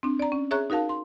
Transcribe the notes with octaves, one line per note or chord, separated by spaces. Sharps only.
C4 D4
D5 A#5
C#4
G#4 C#5 E5 A#5 C#6 F#6
D#4 F#4 A#4 F5 A5
C6